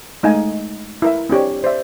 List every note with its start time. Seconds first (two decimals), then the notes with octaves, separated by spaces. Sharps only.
0.23 G#3 A3 D#4 D#5 F5 G#5
1.02 E4 A#4 E5
1.29 C4 D4 G4 C#5
1.64 C5 D5 E5